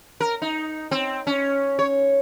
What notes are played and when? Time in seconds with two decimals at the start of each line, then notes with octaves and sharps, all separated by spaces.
0.20 A#4
0.42 D#4
0.91 C4
1.27 C#4
1.79 C#5